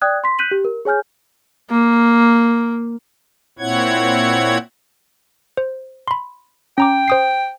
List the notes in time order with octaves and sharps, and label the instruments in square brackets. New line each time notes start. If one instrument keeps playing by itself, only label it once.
[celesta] D5 G5 D#6 F#6 G#6
C6 B6
F#6 G6 B6 D#7 F#7
G4
A#4
G#4 C#5 G#5 F6 G6
[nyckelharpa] A#3
[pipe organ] A#2 C4 E4 C#5 F#5 G#6
[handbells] C5
B5 C6
[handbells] C#4 A#5 D6 [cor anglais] G5
[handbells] C5 D#6 C7